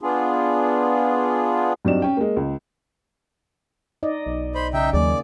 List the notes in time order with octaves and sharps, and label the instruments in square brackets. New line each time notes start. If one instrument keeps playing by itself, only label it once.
[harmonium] B3 D4 F4 G#4
[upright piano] G2 F#3 C4 D#4 D5 E7
C#4 G5
G#3 A#3
C#2
[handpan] D#4 D5 D#5
[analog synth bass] B1
[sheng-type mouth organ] C5 B5
[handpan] C#3 [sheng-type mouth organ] D#4 E5 G5
[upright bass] D#2 [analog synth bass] F#3 [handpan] A#3 G#4 [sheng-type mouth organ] D5